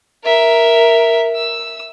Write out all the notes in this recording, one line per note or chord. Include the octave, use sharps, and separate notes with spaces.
A#4 E5
E6